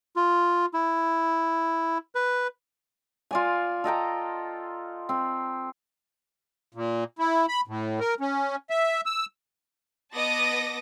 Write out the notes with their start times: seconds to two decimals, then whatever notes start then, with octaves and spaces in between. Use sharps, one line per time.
0.16 F4
0.74 E4
2.15 B4
3.31 F4 D5 G#5
3.84 A4 D#5 G5 A#5
5.09 C4
6.74 A#2
7.19 E4
7.49 B5
7.67 A2
8.00 A#4
8.20 C#4
8.70 E5
9.06 E6
10.14 B3 D#5 A5 D6 D#6 A#6